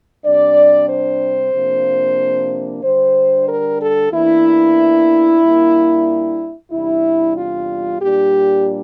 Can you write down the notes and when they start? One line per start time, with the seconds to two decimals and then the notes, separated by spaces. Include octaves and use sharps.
0.25 C3 G3 D4 D5
0.89 C5
1.54 C3 F3 A#3 D4
2.83 D3 G3 D4 C5
3.48 A#4
3.81 A4
4.12 E2 E3 A#3 D4 E4
5.42 A#2 G3 A#3 D4
6.71 E2 C3 G3 D4 E4
7.36 F4
8.00 A#2 G3 D4 G4